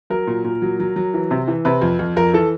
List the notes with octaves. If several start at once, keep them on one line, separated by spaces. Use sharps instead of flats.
F#3 A#4
A#2
A#2
F#3
F#3
F#3
E3
C3
E3
C3 B4
F2
F2
F2 A#4
E3 A4